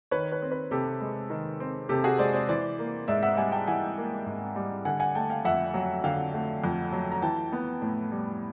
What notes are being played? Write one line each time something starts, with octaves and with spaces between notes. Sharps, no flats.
D#3 B4 C#5
B4 C#5
C4
B4 C#5
C3 G4 A4
G#3
D#3
C4
C3 G4 A4
F#4 G#4
G#3 C5 D5
C5 D5
E3 C5 D5
A#3
G#2 D5 E5
E5 F#5
G3 F#5 G#5
G5 A5
E3 F#5 G#5
A#3
G#2
G3
D3 F#5 G#5
F#5 G#5
A3 G5 A5
F5 G5
F2 E5 F#5
F#3
D3 F5 G5
A3
F2
F#3
A#5
E3 G5 A5
B3
A2
G3